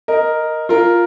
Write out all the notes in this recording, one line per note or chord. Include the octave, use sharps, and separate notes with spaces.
A#4 D#5
F4 A#4